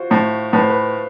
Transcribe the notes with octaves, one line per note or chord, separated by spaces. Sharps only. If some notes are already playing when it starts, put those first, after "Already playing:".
Already playing: F4 F#4 C5
A2 C5
A2 B4
C5
B4